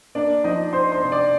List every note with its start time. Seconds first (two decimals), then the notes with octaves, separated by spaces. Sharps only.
0.15 A#3 D4 D5
0.44 F3 D#4 D#5
0.73 D#4 C5 C6
0.92 C5 C6
1.02 C3
1.12 D5 D6